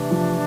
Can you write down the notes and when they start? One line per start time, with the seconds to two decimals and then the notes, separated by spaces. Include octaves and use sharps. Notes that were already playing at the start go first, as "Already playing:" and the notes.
Already playing: C3 E3 A3 D4
0.11 F3